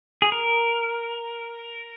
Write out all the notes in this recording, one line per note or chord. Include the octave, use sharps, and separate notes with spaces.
G#4
A#4